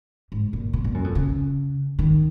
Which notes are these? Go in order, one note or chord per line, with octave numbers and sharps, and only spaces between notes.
G#2
A#2
B2
A#2
F#2
F2
C#3
D#3